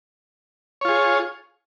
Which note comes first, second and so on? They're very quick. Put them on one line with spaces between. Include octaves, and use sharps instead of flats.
C#5 F4 G#4